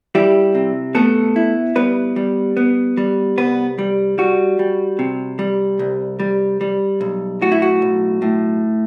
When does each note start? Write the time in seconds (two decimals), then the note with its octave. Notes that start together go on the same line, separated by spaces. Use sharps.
0.15 G3 E4 G4
0.55 C3
0.95 A3 B3 A4
1.36 E4
1.75 G3 B3 B4
2.16 G3
2.57 B3
2.97 G3
3.38 C2 B3 B4
3.78 G3
4.18 G3 F#4
4.59 G3
4.99 C3
5.39 G3
5.79 C2
6.20 G3
6.61 G3
7.01 B1
7.42 A2 F#4
7.52 E4
7.62 F#4
7.82 B1
8.22 A2